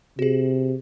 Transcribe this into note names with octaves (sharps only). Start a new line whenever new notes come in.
C3 F#4 G#4